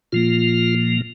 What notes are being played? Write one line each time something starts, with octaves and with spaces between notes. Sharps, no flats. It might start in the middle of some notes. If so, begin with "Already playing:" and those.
A#2 F3 A#3 F4